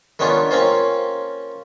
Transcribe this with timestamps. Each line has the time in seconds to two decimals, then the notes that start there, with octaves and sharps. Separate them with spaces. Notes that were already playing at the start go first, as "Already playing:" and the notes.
0.19 D#3 B3 C#4 D4 F4
0.51 A#3 C4 C#4 F4 C5